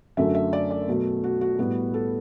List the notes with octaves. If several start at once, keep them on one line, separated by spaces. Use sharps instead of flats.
F#2 D3 F#3 A3 E5
E5
D5
D5
B2 F#3 A3
F#4
F#4
A2 G3 B3 F#4
A4